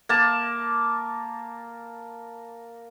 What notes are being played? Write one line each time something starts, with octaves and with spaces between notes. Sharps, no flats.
A#3 A5